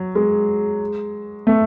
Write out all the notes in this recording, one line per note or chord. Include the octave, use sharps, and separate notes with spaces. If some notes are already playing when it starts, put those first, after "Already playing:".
Already playing: F#3
G#3
A3